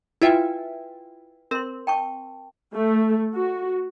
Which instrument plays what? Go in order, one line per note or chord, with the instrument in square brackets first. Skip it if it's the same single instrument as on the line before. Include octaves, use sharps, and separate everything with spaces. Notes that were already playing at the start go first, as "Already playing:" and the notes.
[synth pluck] E4 F4 E5 [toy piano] B4 G5 G#5
[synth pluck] C4 [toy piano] A#4 C6
[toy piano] G5 A5 C#6
[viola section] A3
F#4